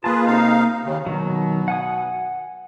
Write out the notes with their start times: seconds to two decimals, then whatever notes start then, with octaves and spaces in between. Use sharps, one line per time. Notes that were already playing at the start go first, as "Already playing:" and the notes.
0.04 A#3 F4 G#4 B4 A5
0.26 C3 D#4 F5
0.83 D#2 C#3
1.06 B2 D#3 F#3
1.68 F#5 G#5 D#6